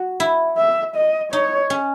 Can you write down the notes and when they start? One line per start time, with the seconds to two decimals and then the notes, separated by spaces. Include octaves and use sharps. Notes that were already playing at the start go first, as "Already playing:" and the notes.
Already playing: F#4
0.20 E4
0.58 E5
0.96 D#5
1.32 D#4 C#5
1.70 C#4